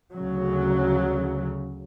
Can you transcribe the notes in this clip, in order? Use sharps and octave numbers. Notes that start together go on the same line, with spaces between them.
D2 C#3 F#3